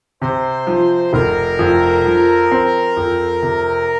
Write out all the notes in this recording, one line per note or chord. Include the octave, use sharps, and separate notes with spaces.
C3 C5
F3
F1 A#4
F2
F3
C4
F2
C3